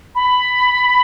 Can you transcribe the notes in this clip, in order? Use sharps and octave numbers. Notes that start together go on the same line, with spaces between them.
B5